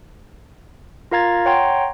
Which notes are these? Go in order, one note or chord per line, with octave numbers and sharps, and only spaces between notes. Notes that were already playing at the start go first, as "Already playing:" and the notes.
F4 A#4 F5 A#5 G#6 A6
C#5 F#5 G5 A#5 C6